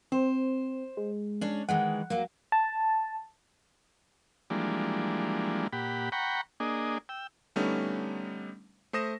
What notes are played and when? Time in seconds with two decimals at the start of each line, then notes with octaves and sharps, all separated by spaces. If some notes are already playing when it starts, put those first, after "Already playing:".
0.12 C4 C5
0.97 G#3
1.41 C#4 D4
1.69 D#3 E3 G#3 F#5
2.10 F#3 A#3
2.52 A5
4.50 E3 F3 G3 G#3 A#3 D4
5.73 A#2 G4 F#5 B5
6.12 F#5 G5 A#5 B5 C#6
6.60 A#3 D4 G#4 D#5
7.09 G5 E6
7.56 D3 G3 A3 B3 C#4 D#4
8.93 A3 C5 D#6 A#6 E7